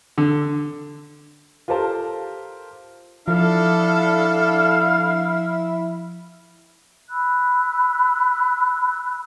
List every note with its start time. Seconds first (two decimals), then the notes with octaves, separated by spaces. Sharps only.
0.18 D3
1.68 F4 G4 A4 A#4 C5 A5
3.28 F3 D4 E4 A4 F5
7.09 B5 E6 F#6